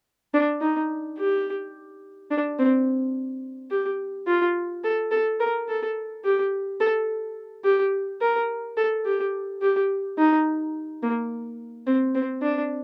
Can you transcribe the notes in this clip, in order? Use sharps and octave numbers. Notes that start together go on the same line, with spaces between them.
D4
D#4
G4
D4
C4
G4
F4
A4
A4
A#4
A4
G4
A4
G4
A#4
A4
G4
G4
D#4
A#3
C4
C4
D4